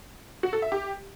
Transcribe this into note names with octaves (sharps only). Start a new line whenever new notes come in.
F#4
A4
E5
G4